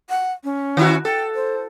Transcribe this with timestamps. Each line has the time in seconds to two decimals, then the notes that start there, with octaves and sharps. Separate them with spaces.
0.10 F#5
0.44 C#4
0.77 D#3 E4 F#4
1.05 A4 G5
1.35 C5